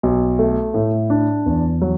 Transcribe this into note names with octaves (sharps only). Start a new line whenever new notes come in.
B1
A3
A2
D4
E2
F#3